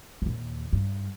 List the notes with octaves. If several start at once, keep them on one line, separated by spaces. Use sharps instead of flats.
D#2 A#2
G2